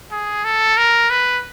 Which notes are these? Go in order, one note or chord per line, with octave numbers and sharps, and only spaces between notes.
G#4
A4
A#4
B4